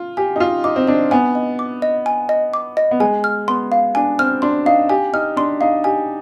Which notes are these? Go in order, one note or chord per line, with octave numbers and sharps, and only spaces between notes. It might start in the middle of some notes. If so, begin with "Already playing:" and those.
Already playing: F4
G4 G#5
D#4
F4 D#5
D#4 D6
C4
D4 D#5
B3 G#5
D#5
D6
D#5
G#5
D#5
D6
D#5
B3
G#3 G#5
F6
B3 C6
F5
D4 G#5
C4 F6
D4 C6
D#4 F5
G4 G#5
D#4 F6
D4 C6
D#4 F5
G4 G#5